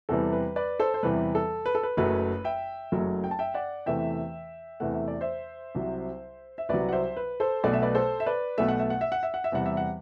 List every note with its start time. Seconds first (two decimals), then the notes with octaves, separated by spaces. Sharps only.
0.09 E2 C3 E3 G3 A4
0.33 B4
0.56 B4 D5
0.80 A4 C5
0.94 C5
1.03 E2 C3 E3 G3 B4
1.35 A4
1.66 B4
1.75 A4
1.83 B4
1.97 F#1 F#2 F#3 A3 B4
2.44 E5 G5
2.92 F#1 F#2 F#3 A3
3.24 G5
3.31 A5
3.39 E5 G5
3.54 D5 F#5
3.86 E2 C3 E3 A3 E5 G5
4.80 E2 C3 E3 A3 F#5
4.94 E5
5.08 D5
5.21 C5 E5
5.75 C2 C3 F#3
6.58 E5
6.69 C2 C3 F#3 B4 D5
6.89 F#5
6.92 C5 E5
7.17 B4
7.40 A4 C5
7.64 B1 B2 A3 D5
7.73 E5
7.82 B4 D5
7.95 A4 C5
8.20 E5
8.26 B4 D5
8.58 B1 B2 A3 E5
8.68 F#5
8.79 E5
8.90 F#5
9.01 E5
9.12 F#5
9.23 E5
9.34 F#5
9.44 E5
9.52 E2 C3 G3 F#5
9.66 E5
9.77 F#5